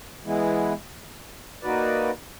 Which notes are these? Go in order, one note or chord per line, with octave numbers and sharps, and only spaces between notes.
E3 G#3 B3 E4
A#3 D#4 F#4 B4 D5